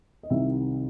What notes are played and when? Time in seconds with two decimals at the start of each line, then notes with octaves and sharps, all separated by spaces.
0.23 D#5
0.30 C2 C3 D#3 E5